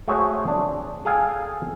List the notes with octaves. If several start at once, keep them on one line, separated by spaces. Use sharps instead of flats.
A3 F#4 G#4 C5 C#5 E5
D4
G#4 A4 F5 G5 G#5